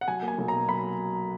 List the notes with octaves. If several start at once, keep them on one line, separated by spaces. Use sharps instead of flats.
F#5
F#3 G#5
A#3
G#5
B1
B2 A#5
F#3 B5